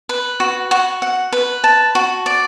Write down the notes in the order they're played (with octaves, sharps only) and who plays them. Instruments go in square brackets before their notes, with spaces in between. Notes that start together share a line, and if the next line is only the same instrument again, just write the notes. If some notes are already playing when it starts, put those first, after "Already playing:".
[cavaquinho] B4
F#4
F#4
F#5
B4
A5
F#4
D5